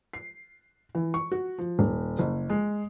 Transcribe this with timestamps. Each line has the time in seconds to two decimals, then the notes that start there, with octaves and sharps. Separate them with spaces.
0.13 C7
0.95 E3
1.14 C#6
1.32 F#4
1.58 F3
1.79 D#1
2.19 F#1
2.50 G#3